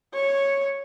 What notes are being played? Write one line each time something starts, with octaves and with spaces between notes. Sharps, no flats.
C#5